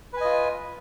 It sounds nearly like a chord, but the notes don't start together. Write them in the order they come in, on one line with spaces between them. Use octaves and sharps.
B4 G#5 D#5 F4